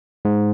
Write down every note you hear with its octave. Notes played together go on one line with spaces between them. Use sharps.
G#2